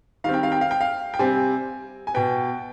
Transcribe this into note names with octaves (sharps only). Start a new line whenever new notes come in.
D#3 G3 C4 F5
G5
F5
G5
F5
G5
F5
G5
C3 G3 C4 G#5
G#5
B2 B3 G5